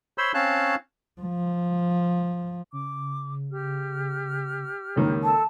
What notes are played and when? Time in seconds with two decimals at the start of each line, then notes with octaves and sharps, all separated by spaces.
0.18 C5 C#5 B5 C6 E6
0.34 C4 C#4 C#5 F5 A5 F#6
1.21 F3
2.73 C#3 D6
3.52 G4 F6
4.96 C#2 D#3 A#3
5.24 A4 A5 E6